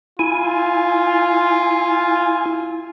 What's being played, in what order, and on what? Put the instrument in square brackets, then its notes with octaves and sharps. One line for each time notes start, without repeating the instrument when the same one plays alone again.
[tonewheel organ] E4 G#5 [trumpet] F4